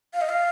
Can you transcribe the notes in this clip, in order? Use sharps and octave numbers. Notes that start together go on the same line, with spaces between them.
F5
D#5
F5